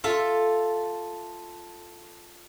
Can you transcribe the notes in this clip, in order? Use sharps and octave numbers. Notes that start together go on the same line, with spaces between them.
F4 A4 E5